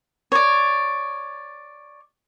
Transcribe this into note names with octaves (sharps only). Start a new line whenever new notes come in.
C#5 D5